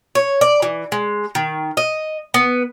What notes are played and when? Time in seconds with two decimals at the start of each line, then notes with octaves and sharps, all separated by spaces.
0.15 C#5
0.41 D5
0.62 E3
0.92 G#3
1.35 D#3
1.77 D#5
2.34 B3